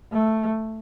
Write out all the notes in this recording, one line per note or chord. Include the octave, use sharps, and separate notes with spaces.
A3